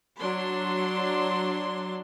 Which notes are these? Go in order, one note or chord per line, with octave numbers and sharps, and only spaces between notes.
F#3 D4 C6